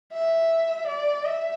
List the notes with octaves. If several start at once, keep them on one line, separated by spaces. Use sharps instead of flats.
E5
D5
E5